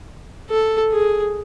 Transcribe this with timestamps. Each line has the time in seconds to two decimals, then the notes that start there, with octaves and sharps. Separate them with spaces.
0.50 A4
0.92 G#4